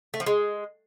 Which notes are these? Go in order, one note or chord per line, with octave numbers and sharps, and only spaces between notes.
A3
F3
G#3